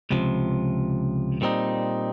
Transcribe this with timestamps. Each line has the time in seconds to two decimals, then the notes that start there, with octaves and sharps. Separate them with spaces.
0.11 C#2 C3 F3
1.41 A#2 G3 C4 D#4